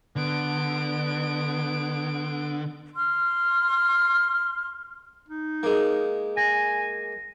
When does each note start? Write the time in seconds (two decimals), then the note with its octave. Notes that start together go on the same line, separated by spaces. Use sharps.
0.16 D3 B3 D7
2.95 C6 F6
5.29 D#4
5.63 G#3 A#3
6.37 G#5 A#6